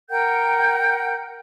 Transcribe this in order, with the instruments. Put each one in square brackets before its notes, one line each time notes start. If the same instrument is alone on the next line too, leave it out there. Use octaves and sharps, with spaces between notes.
[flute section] A#4 F#5 G5 G6